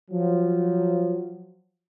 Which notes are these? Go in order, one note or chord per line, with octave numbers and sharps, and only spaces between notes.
F3 F#3